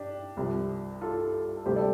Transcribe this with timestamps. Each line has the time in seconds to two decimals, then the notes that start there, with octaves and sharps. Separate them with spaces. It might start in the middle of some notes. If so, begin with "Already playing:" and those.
Already playing: D4 G4
0.37 C2 C3 F3
1.01 F4 A4
1.57 A4
1.66 D2 C3 G3 G4 C5
1.76 A4 D5